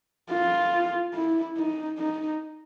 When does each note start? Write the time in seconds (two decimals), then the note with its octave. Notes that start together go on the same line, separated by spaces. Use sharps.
0.32 F4
1.15 E4
1.58 D#4
1.99 D#4